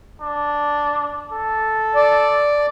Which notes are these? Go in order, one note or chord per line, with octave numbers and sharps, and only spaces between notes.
D4
A4
D5